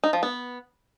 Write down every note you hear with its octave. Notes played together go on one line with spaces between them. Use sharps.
D#4
F3
B3